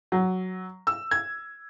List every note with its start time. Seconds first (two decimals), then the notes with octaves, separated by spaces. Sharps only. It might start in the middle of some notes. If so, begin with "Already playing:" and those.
0.12 F#3
0.87 E6
1.11 G#6